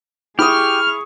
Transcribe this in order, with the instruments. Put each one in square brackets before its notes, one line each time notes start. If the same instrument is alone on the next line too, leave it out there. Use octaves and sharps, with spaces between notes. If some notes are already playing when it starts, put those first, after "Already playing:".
[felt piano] E4 D#6 [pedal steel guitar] G4 [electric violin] G#4 C#6 [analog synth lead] F6